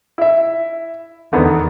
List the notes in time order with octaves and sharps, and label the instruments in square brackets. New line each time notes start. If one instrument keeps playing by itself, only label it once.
[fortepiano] E4 E5
[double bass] E2 [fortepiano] D3 D#3 B3